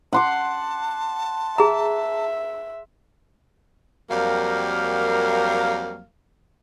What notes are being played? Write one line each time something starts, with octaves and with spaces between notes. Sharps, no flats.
F#5 A5 C6 D6
G#4 E5 A#5
F2 F#3 G3 A#3 A#4 F5